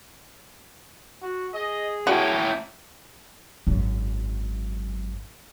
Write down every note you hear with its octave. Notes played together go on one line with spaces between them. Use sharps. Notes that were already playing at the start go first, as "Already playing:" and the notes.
F#4
G#4 D#5
C#4 E4 F#4 A#4 C#5 G5
G#1 F#2